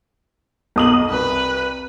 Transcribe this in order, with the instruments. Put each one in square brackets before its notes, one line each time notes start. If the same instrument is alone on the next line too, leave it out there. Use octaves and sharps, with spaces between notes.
[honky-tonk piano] B1 D#6 F#7
[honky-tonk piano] C2 [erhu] B4